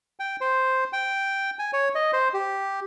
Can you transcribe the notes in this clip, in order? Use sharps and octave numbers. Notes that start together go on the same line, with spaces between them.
G5
C5
G5
G#5
C#5
D#5
C5
G4